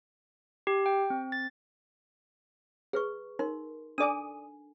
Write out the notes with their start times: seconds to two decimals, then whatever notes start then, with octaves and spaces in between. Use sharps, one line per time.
0.67 G4
0.86 G5
1.10 C4
1.32 A6
2.93 G#4 B4 C#6
3.39 D#4 A#4 C6
3.98 D4 A4 D5 G#5 D#6